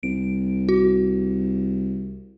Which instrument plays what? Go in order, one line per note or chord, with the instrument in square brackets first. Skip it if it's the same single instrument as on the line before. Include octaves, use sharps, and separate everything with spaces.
[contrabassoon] C2 [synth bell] D7
[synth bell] F#4